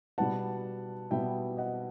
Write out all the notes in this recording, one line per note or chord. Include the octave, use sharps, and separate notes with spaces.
B2 G3 B3 F#5 A5
B2 G3 B3 E5 G5
D#5 F#5